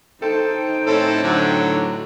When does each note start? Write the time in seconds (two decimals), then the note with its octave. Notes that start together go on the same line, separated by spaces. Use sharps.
0.22 D#4 A4 C5 G5
0.87 A2 C4 C#4 A4
1.23 D3 F#3